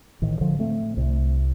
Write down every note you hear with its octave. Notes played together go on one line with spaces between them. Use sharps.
A1 A2 D#3
D3 F3
A3 C4
C2 C3